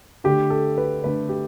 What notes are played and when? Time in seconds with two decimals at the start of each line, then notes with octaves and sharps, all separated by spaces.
0.24 D3 A3 D4 G4
0.50 A4
0.78 B4
1.03 D3 A3 D4 B4
1.29 G4